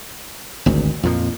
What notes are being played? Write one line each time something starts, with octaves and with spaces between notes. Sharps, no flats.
G#1 D2
F2 A#2 F3